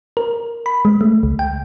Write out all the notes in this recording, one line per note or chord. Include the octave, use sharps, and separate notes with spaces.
A#4
B5
G#3
A3
C#2
G5